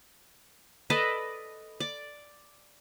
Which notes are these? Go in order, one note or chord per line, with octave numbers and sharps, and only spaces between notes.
A4 B4 D5 D#5
D5